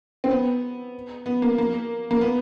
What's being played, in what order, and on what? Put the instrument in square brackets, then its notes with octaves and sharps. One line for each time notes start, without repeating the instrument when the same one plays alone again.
[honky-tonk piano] C4
B3
B3
A#3
A#3
A#3
B3